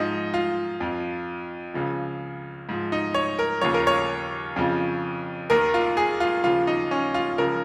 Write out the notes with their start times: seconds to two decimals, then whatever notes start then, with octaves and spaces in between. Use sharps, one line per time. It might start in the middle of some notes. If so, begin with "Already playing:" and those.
Already playing: G#2 F3 D#4
0.34 F4
0.80 F2 F3
1.74 C#2 C#3 F3
2.69 G#2 F3
2.92 D#4
3.14 C#5
3.39 A#4
3.61 D#2 C#3 F3 C#5
3.74 A#4
3.87 C#5
4.56 F2 C#3 F3
5.50 D#2 D#3 A#4
5.74 F4
5.97 G#4
6.20 F4
6.43 D#2 C#3 F3 F4
6.67 D#4
6.91 C#4
7.14 F4
7.38 C#2 C#3 F3 A#4